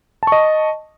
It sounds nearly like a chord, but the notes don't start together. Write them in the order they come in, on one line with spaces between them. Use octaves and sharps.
A5 C#6 D#5